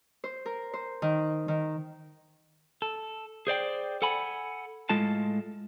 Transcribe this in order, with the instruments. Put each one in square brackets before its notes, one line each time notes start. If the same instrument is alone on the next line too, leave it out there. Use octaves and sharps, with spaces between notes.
[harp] C5
A#4
C5
D#3
D#3
[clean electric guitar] A4
G#4 C5 D5 G5
A4 F#5 G#5 B5
A2 G#3 F4 A4 A5